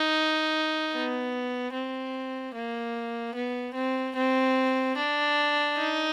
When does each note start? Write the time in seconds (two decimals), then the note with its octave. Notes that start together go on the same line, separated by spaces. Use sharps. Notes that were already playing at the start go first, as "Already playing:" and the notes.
Already playing: D#4
0.93 B3
1.73 C4
2.55 A#3
3.35 B3
3.75 C4
4.16 C4
4.97 D4
5.76 D#4